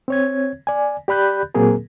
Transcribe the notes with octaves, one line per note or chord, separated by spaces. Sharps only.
C4 C#5 G#6
D5 G#5
G4 D5 B5 F#6 G6
A#2 F#3 A#3 C4 G#4 A#4